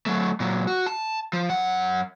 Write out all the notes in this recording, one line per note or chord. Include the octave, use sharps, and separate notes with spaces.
F#3 A3
A#2 F#3
F#4
A5
F3
F#2 F#5